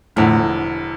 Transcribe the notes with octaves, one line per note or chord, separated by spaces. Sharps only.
E1 E2 A2 D3 F3